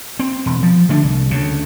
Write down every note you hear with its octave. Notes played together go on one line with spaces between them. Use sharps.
C4
E1
F3
D3 A3 D4
C2
D2 C#3